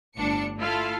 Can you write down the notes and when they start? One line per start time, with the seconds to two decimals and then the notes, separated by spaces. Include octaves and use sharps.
0.16 G1 A2 D4 C#7
0.58 A3 E4 F4 A4 F5